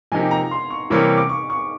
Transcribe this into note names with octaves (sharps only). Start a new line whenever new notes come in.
C3 F3 A#3 D#4 G4 G#5
A#5
C6
C#6
C3 E3 G3 A#3 C#4
D6
C#6
C#6